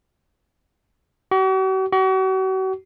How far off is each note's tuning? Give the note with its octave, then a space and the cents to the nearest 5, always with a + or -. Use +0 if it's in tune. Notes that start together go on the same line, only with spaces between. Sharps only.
F#4 +45
F#4 +40